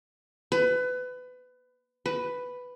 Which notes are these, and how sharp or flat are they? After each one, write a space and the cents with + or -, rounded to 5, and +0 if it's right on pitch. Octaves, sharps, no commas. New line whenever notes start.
B4 +25
B4 +5